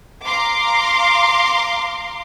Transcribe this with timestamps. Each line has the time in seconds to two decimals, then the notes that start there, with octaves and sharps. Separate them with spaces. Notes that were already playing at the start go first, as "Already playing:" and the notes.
0.25 F5 A#5 C6 D6